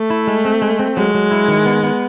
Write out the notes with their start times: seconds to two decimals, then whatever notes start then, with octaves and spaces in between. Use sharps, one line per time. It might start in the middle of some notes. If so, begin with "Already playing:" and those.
Already playing: A3
0.10 E4
0.27 G#3
0.45 C4
0.62 G#3
0.79 C4
0.97 F#3 G#3
1.15 F#3
1.31 E4
1.48 D#3
1.66 B3
1.83 B3